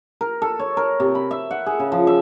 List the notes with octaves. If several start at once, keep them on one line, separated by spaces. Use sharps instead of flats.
A#4
A4
C#5
A#4
C3
B5
E5
F#5
G#4
C#3
F3
E5